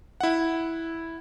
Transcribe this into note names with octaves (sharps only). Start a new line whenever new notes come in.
E4 F#5